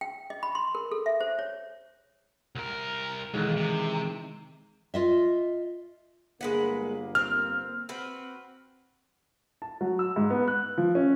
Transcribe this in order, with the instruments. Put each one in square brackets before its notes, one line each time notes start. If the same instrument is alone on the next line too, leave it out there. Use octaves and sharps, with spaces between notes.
[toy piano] G5
D#5
B5
C6
A#4
A4
E5
C5
C#5
[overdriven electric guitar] C2 A#4
[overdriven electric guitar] B1 [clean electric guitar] D#3 E3 G#3
[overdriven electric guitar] C3
[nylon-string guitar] F4 D#5 E5
[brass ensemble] G1 A#3 [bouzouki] G#3 B4 F#5
[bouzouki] C4 [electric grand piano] F6
[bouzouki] C4 F#4 B4
[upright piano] A5
F#3
E6
G#2
B3
F#6
F3
C#4